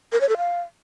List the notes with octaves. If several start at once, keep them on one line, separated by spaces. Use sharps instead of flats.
A#4
C#5
A4
F5